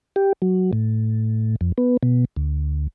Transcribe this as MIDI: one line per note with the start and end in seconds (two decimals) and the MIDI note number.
0.16 0.33 67
0.42 0.71 54
0.73 1.56 45
1.61 1.72 41
1.78 1.97 59
2.03 2.25 47
2.36 2.87 38